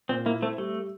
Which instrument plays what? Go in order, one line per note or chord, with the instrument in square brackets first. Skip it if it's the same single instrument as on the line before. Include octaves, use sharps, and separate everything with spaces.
[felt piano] A#2 [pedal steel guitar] C4
[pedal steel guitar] A#3 [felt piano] E4
[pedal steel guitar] A3 [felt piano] C4
[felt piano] G3 [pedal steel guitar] A3